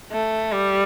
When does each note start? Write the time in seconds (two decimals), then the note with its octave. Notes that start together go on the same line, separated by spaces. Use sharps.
0.12 A3
0.52 G3